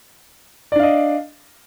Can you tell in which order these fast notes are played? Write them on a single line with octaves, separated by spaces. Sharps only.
D5 D4 F5 D#5